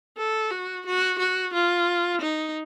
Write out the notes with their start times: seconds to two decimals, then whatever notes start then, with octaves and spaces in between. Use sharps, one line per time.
0.18 A4
0.51 F#4
0.86 F#4
1.19 F#4
1.54 F4
2.21 D#4